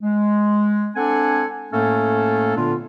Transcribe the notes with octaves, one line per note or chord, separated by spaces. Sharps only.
G#3
C4 D4 A4 F#5 G#5
A2 A3 A#3 C#4 A4
A#2 D3 B3 D4 F4